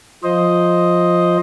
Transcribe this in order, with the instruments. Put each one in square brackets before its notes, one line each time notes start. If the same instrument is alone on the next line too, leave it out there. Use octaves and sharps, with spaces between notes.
[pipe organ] F3 C5 D#5